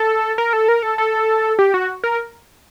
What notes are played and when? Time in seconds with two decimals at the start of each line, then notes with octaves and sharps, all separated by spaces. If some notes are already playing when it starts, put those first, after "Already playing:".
Already playing: A4
0.38 A#4
0.53 A4
0.68 A#4
0.83 A4
0.98 A4
1.59 G4
1.74 F#4
2.04 A#4